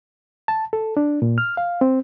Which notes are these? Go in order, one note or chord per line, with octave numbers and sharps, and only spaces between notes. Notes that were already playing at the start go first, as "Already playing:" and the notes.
A5
A4
D4
A#2
F6
F5
C4